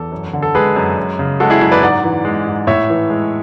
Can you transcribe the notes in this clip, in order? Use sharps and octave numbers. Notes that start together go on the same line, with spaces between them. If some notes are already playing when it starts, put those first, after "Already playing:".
Already playing: E2 A4
F#2
D3
A4
G#3 G#4 B4
F#2
F#2
C#3
G#3 F#4 A4
E4 G#4
F#2 E4
B4 D5
G#2 D5 F#5
E3
G#3
G#2
A2 C#5 E5
E3
G#3